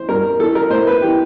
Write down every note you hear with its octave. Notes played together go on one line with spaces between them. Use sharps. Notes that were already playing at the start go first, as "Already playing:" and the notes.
Already playing: E3 C5
G2 A#4
E3 A4
A#4
A2 C5
B4
E3 G4